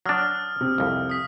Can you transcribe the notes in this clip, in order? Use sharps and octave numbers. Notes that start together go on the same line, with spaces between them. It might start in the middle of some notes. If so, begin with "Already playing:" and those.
F#3 D4 D#6 F6
C3
C2 F2
D#6 B6